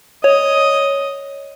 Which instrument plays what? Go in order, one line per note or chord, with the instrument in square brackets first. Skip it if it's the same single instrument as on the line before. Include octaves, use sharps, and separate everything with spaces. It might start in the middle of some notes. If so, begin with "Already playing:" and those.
[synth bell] C#5 [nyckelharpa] D#5